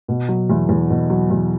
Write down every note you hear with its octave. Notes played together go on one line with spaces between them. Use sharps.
B2
F#3
E2
E2
B2
F#3
E2